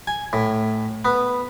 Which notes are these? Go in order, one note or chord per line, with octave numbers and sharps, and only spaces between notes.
G#5
A2
B3